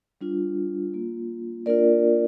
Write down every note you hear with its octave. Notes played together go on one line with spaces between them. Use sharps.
G3 D4 F4
A#3 F4
A#3 D4 F4 A#4 D5